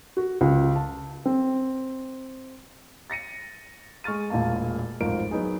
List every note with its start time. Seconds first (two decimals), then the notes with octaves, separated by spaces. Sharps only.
0.17 F#4
0.41 C#2
0.76 A5
1.26 C4
3.10 A6 A#6 C#7 D#7
4.04 G#3 C#6 F6 A6 D#7
4.30 E1 D2 A#2 A#3 A5
5.00 D1 G#1 F2 F3 A#4 D7
5.31 F#3 B3 D#4 G#4